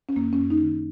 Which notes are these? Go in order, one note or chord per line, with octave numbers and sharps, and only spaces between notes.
C#4
F#2 A#3
C#4
F#2
D#4
D#3